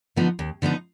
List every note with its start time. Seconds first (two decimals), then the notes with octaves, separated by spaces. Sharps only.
0.16 D3 F3 B3 D#4
0.39 D#2
0.62 D3 F3 B3 D#4